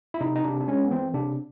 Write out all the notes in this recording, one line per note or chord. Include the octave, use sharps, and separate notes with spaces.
E4
C3 D#4
D#4
C3 D4
D4
G#3 C#4
B3
E3 C4
C3 D4